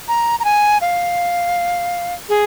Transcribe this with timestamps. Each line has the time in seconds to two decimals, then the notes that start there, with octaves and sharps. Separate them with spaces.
0.08 A#5
0.40 A#5
0.45 G#5
0.81 F5
2.29 G#4